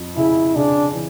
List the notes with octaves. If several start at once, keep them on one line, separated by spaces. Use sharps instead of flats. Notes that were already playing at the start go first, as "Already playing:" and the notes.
Already playing: F2
C#3 E4
C#3 D4
E3